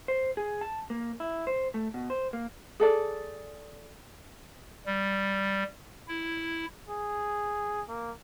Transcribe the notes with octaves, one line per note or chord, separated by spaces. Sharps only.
C5
G#4
A5
A#3
E4
C5
A3
B2
C5
A#3
G#4 A4 D5
G3
E4
G#4
A#3